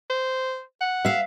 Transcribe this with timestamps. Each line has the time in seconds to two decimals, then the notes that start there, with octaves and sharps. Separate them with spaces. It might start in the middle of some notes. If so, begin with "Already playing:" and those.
0.10 C5
0.81 F#5
1.05 E5 F5